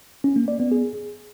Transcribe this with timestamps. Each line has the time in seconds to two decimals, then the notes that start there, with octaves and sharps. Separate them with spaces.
0.24 C#4
0.36 A#3
0.48 D5
0.60 B3
0.72 G#4